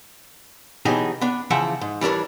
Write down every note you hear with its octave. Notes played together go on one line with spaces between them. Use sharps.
B2 E3 F#3 D#4 G4 G#4
B3 D4
C#3 E3 F3 E5 F#5
G#2
E3 G3 D4 A#4 C#5